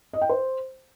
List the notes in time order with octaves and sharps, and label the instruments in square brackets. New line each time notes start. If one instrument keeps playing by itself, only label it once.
[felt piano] D#5
G5
C5